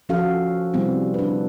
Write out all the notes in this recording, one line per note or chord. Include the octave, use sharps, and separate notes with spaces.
F3 C#4 F#4 A4 F5
C3 G3 B3 C4 E4
D4 B4